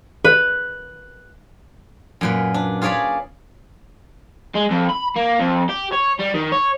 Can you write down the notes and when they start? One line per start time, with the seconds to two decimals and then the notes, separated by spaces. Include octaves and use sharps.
0.24 B4
2.21 F#2 A#2 B4
2.54 D4
2.82 F4 G#4 C#5 D5 B5
4.55 G#3
4.70 F2
4.90 B5
5.16 A#3
5.40 F2
5.69 G4
5.93 C#5
6.19 G3
6.34 D#3
6.52 C#5